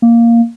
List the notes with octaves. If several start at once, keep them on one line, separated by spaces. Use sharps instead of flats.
A#3